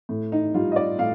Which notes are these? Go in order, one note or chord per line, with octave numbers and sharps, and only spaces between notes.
A2
D#4
G3 F4
D#5
D5
A2 F5